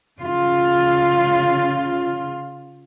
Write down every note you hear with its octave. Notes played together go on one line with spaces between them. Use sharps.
C#3 F4